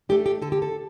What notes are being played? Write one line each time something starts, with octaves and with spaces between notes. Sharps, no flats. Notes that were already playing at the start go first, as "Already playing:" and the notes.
A3 D4 G4
G4
D3 A4
G4
A4